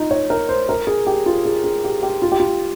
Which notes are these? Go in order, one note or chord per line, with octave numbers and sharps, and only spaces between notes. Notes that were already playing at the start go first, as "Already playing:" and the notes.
Already playing: D#4 F4
C#5
A#4
C5
A#4
G#4
G4
F4
G#4
G#4
G4
G4
F4
G4
F4